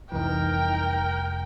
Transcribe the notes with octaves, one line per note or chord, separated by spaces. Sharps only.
F1 C2 E3 D#4 A#4 G5